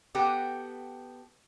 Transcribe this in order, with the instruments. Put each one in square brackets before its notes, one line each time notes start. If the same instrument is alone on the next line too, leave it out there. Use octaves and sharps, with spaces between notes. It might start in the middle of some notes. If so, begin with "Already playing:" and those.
[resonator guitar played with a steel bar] B3 F#4 G4 A4